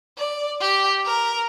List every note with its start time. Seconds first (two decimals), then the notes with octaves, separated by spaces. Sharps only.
0.17 D5
0.60 G4
1.05 A#4